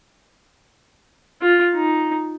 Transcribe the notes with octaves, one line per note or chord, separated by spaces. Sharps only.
F4
D#4